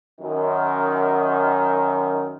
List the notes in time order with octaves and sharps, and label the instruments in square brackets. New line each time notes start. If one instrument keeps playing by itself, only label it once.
[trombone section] F#2 D#3